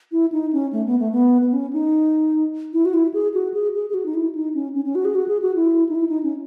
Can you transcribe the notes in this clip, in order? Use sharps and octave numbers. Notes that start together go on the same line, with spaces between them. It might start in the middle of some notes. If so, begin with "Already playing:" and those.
E4
D#4
C#4
A3
B3
A3
B3
B3
C#4
D#4
E4
F#4
E4
G#4
F#4
G#4
G#4
G#4
F#4
D#4
E4
D#4
C#4
C#4
C#4
F#4
G#4
F#4
G#4
F#4
E4
D#4
E4
D#4
C#4